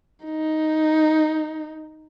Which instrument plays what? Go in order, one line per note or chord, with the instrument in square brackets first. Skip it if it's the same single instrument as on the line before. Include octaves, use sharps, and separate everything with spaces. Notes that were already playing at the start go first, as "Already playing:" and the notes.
[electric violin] D#4